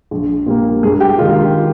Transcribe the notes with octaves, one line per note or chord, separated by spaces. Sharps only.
A#1
A#2 G3 A#3
G2 G#4
G4
D#3 G#3 F4
F4